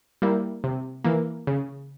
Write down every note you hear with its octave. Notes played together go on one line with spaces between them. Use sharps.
G3 A#3 E4
C3
E3 A#3
C#3